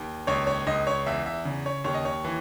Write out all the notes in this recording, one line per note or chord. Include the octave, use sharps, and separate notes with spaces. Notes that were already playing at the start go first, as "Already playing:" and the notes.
Already playing: D#2
C#2 C#5
C#5
C#2 D#5
C#5
E2 E5
E5
C#3
C#5
D#2 C#5
D#5
C#5
E3